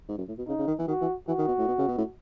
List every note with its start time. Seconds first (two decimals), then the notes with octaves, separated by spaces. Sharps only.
0.08 G#2
0.18 F#2
0.28 A2
0.38 B2
0.48 C#3 D#4
0.59 C#3
0.67 D#3
0.78 E3
0.88 D#3 F#4
1.01 E3
1.28 E3 F#4
1.38 D#3
1.48 B2
1.59 A2
1.68 B2
1.78 C#3
1.88 B2
1.98 A2